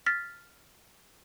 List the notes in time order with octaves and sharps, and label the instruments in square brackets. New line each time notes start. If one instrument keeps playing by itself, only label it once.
[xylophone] F6 A6 B6